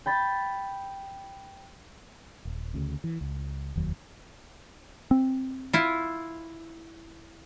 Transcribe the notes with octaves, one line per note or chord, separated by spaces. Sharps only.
G5 B5 A6
D#1
D2 C#3
E3
C#2
F1 D#2 D#3 F#3
C4
E4 F4